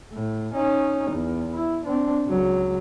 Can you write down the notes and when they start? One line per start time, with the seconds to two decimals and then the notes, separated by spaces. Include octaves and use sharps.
0.13 A2
0.54 C#4 D#4
1.11 E2
1.54 E4
1.85 C4 D4
2.27 C#2 F#3